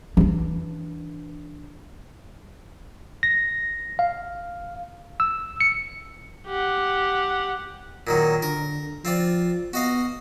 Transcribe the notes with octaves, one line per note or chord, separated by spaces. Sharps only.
E3 D4
A#6
F5
E6
C#7
G4 F#5
A#2 D#3 F#3
D3 A#4
F3 C4 F4 D5
B3 F#4 D#5 F5